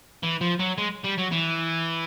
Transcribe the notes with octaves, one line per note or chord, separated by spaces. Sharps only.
E3
F3
F#3
G#3
G3
F#3
E3